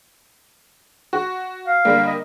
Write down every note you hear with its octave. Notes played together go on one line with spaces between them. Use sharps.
F#4
F5
D3 G3 A#3
D#5